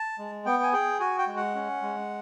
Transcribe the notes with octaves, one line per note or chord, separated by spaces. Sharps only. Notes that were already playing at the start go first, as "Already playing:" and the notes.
Already playing: A5
G#3
B3 G5
G#5
G#4 G5
F#4 G#5
G5
G#3
F#5
C#4
G#3